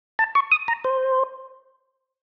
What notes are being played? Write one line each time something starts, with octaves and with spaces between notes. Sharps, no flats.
A5
C#6
D#6
A#5
C5